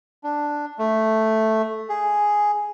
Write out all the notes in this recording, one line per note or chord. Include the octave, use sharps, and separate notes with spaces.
D4
A3
G#4